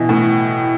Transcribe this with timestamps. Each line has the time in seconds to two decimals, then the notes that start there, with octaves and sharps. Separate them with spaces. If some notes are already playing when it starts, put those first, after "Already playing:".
Already playing: B2 E3
0.09 A2